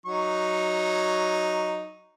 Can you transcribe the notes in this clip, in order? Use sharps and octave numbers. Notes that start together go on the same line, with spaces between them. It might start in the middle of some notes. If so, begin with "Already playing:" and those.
F#3 D#4 C#6